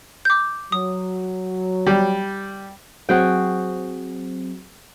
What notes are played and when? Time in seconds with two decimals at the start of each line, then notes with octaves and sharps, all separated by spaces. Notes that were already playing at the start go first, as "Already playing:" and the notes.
0.25 D6 G6
0.72 F#3 D#6
1.87 G3
3.09 F#3 C4 F#4 G#4 G5